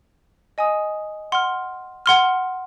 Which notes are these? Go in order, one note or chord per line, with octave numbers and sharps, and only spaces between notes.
D#5 G#5 D#6
F#5 C6 F6
F#5 C6 F6